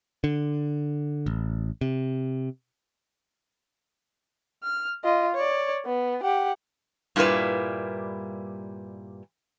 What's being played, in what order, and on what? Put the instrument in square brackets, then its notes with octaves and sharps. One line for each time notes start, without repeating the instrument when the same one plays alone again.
[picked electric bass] D3
A1
C3
[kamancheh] F6
F4 D#5
C#5 D5
B3
G4 F#5
[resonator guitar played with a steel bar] G2 A#2 G3 A#3 E4 B4